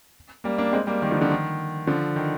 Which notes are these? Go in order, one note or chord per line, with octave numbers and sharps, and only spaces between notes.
G3 A#3
A#3 D4
G#3 C4
G3 A#3
D#3 G3
D3 F3
D3 F3
D#3
D3 F3
D#3